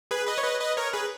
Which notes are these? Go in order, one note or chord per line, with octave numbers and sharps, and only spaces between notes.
G#4 B4
B4 D#5
C#5
B4 D#5
B4 D#5
A#4 C#5
G#4 B4